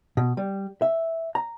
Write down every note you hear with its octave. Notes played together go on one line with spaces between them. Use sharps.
B2
G3
E5
A#5